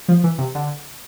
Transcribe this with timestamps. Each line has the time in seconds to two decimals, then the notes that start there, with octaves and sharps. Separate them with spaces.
0.08 F3
0.24 E3
0.38 C3
0.55 D3